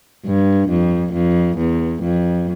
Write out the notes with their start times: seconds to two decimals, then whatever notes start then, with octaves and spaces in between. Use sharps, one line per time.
0.25 G2
0.69 F2
1.13 F2
1.57 E2
2.02 F2